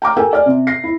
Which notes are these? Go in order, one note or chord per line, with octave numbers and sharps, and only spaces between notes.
G5 A#5 D6 F6
G4 A4 A#4 G5 G#5 E6
D5 G#5 F6
C3
A#6 C7
E4